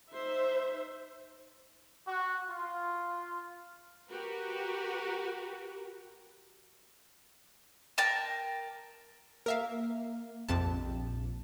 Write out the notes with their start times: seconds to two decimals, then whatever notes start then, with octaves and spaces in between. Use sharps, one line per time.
0.13 D#4 C5 E5
2.07 F#4
2.49 F4
4.10 F#4 G4 A#4 B4
7.98 A#4 G5 A5
9.46 A#3 A#4 E5 F5
10.49 A#1 F2 C3 A5